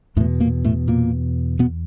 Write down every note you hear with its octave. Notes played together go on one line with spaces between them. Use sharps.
E2 A2 B2 A3
A#2 A#3
A2 A3
A#2 A#3
B2 B3